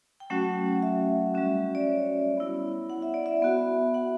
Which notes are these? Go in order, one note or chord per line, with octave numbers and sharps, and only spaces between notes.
G5
F#3 A3 C#4 F#4 F#5
E5
G3 C#4 F#4
D5
C#5
B3 E4
F#5
E5
D5
E5
B3 F#4
F#5